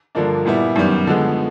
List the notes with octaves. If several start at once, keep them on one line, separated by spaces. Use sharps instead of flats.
G2 D3 F3 A#3 D4
A#2 G3 B3 E4
F#2 D#3 G3 B3
D3 F3 G#3 B3